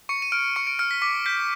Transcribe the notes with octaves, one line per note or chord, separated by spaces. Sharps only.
C#6 C#7
D#7
F6 D7
C#6 C#7
D7
F6 C#7
B6
D6 B6
G6 B6